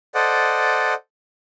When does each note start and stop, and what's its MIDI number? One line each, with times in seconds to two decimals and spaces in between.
0.15 0.94 69
0.15 0.94 72
0.15 0.94 74
0.15 0.94 75
0.15 0.94 78